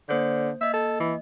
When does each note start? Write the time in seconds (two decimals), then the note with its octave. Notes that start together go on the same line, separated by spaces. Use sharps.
0.09 D3 A#3 C5 G6
0.61 A#3 D#5 E5
0.73 A4
1.00 E3